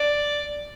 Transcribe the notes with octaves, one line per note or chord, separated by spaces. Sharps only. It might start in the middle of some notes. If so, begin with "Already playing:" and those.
Already playing: D5